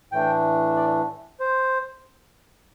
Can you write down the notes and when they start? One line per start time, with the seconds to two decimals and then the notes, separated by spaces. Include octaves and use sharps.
0.12 A2 E3 A3 D4 G5
0.76 D5
1.40 C5